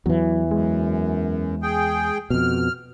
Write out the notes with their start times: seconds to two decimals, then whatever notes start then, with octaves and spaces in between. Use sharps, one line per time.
0.06 E2 E3 F#3
0.51 F#2 G#3
1.63 G#4 G5
2.30 F2 B2 F6